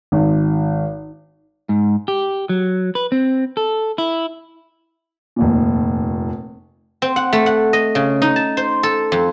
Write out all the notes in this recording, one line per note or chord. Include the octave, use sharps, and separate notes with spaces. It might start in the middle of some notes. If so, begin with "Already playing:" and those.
G#1
G#2
G4
F#3
B4
C4
A4
E4
F1 D#2 A#2
C4
F#5
A3
F#5
D#5
C#3
D#4
A5
C5
A4
F2